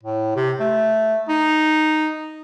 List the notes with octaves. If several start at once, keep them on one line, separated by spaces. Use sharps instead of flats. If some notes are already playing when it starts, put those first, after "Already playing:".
A2
C3
A3
D#4